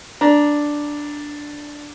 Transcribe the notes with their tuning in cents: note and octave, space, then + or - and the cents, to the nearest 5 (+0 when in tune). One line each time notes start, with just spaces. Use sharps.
D4 +0 A#5 +15